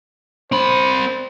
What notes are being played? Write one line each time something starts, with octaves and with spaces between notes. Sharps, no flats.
C4 C5 B5